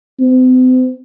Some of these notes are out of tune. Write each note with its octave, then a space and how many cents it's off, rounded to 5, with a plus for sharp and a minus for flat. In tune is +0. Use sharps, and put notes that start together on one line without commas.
C4 -45